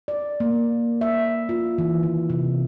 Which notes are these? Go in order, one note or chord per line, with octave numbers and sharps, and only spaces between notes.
D5
A#3
E5
F4
E3
D#3
C3